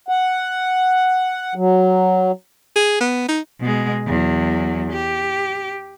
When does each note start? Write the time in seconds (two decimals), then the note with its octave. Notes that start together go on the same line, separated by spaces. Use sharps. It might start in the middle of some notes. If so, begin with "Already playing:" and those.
0.08 F#5
1.55 F#3
2.76 G#4
3.01 B3
3.29 D#4
3.61 B2 G#3
4.07 E2 F#3
4.92 G4